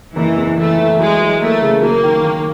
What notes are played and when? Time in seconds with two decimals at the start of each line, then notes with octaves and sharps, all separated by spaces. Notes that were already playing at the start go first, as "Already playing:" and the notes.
0.16 F#1 E3
0.37 E2
0.57 E3 A3
0.78 E3
0.98 F#3 G#3
1.20 F#3
1.41 A3 A#3
1.61 C#3
1.81 F#3 A#3
2.03 D#3
2.23 D#3